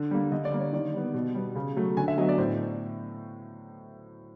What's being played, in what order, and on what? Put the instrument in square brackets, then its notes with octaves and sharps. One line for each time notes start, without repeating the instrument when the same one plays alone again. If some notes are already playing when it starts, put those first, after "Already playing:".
Already playing: [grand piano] D3
G3 A#3
D3 D#5
D5
G3 A#3
C#5
D#3 D5
G3 B3
B2
G3 B3
C#3
F#3 A3
D3 G#5
E5
F#3 D#5
B3
D5
A2 C5